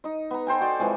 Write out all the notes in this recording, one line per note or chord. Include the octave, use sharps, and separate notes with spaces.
D#4 D#5
B3 A#5
A4 C5 G5 G#5
F#4 D5
E3 F3 G#3 C4